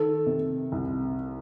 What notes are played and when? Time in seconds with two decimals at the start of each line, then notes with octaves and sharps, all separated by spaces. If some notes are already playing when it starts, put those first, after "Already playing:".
Already playing: D#3 A4
0.26 C3
0.72 C2